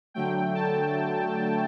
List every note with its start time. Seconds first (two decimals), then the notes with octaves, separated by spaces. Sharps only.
0.14 D3 F#3 A3 G5
0.55 A5